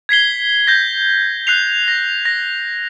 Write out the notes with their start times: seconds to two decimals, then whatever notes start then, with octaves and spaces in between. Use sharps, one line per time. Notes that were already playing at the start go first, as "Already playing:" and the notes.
0.09 G#6 B6 C7 G7
0.67 G6 A#6
1.47 F#6 C7 F7
1.88 A#6
2.25 A#6